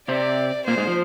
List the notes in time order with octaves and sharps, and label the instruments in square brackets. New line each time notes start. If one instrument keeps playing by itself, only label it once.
[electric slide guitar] C3 C4 [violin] D5
[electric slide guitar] A#2 A#3 [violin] C5
[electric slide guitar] G#2 G#3
F3